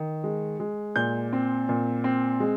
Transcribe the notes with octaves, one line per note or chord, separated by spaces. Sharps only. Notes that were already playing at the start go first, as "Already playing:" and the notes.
Already playing: D#3
G#3
G#3
A#2 G6
C4
A#2
C4
G#3